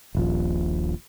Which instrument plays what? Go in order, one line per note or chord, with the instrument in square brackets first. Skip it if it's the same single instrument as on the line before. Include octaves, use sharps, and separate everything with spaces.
[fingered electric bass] D#1 A#1 F3